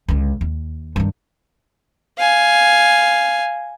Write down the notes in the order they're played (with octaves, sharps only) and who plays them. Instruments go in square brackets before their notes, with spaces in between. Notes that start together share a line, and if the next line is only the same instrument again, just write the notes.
[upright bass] C#2 D3
D#2
G2 D#3
[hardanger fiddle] F5 G#5